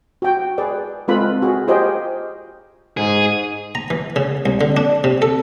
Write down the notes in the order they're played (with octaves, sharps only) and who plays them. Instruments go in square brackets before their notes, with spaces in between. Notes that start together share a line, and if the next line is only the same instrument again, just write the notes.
[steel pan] F#4 G5
G#4 B4 D5
G#3 C4 F4 A4 B4 B5
F#4 G#4
F4 G4 G#4 C5 D#5 G5
[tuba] G#2 [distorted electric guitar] G#4
[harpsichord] A#5
E3
C#3
C2
D3
D4
C3
A4